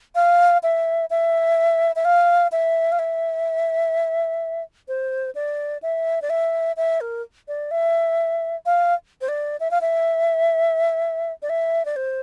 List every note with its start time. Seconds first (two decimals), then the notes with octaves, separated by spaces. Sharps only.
0.15 F5
0.63 E5
1.10 E5
1.96 E5
2.05 F5
2.52 E5
2.92 F5
2.99 E5
4.88 C5
5.35 D5
5.82 E5
6.22 D5
6.30 E5
6.77 E5
7.01 A#4
7.48 D5
7.71 E5
8.66 F5
9.21 C5
9.28 D5
9.60 E5
9.71 F5
9.81 E5
11.42 D5
11.50 E5
11.85 D5
11.96 C5